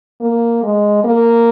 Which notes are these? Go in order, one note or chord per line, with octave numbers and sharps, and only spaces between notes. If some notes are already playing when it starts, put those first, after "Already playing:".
A#3
G#3
A#3